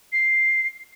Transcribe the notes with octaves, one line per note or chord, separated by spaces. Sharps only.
C7